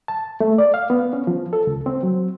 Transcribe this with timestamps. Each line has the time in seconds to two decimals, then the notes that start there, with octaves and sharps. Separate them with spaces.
0.08 A5
0.40 A3
0.58 D5
0.74 F5
0.90 B3
1.13 C#4
1.27 F3
1.53 A4
1.67 C#2
1.86 C4
2.03 F#3